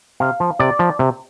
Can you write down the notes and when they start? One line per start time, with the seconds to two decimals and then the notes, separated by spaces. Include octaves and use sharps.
0.20 C3 F5
0.40 F3
0.59 C3 D5
0.79 F3
0.99 C3